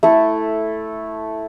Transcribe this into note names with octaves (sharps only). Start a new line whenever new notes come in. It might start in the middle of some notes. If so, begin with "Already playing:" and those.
A3 E4 A4